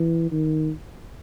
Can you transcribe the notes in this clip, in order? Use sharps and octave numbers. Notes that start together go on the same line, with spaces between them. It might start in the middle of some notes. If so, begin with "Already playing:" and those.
Already playing: E3
D#3